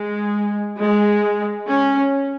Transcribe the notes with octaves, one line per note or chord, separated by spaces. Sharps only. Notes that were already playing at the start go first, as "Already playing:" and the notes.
Already playing: G#3
G#3
C#4